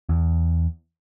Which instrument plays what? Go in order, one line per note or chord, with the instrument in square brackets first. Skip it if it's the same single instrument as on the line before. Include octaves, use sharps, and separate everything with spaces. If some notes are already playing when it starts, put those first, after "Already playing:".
[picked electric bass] E2